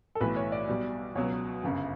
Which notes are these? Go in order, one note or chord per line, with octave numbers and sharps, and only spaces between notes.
A4
B1 A2 E3 B4
C#5
D5
B1 B2 G3
C#2 B2 F#3 C#5
G1 F#2 C#3